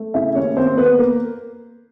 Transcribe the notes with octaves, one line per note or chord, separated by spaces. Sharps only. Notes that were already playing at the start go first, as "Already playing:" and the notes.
Already playing: A3
C#3 E4 E5
D#2 C#4 C#5
D#2 C4 C5
D#2 B3 B4
A#3